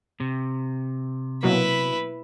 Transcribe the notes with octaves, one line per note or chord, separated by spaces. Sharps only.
C3
B2 F#3 A#3 E4 B4